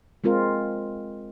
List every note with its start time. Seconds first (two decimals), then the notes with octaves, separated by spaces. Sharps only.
0.24 G#3 C4 F4 A#4